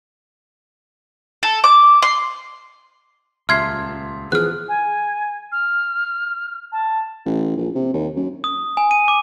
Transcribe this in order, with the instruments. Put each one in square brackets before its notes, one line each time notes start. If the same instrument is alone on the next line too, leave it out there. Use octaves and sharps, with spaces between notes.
[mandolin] A4
D6
C6
[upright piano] D#1 E5 C6 [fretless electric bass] C#2 [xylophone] F6 G#6 C7
[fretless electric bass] E3 F3 B3 [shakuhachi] G#4 [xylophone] F6 F#6
[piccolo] G#5
F6
A5
[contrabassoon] A1
A#1
C3
D#2
F#2
[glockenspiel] D#6
G#5
D#7
D6